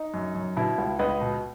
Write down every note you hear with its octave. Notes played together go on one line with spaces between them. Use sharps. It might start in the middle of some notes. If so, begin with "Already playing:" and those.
Already playing: D#4
F#2
F#2
B2 E4
C#2
C#2 B4 D#5
B2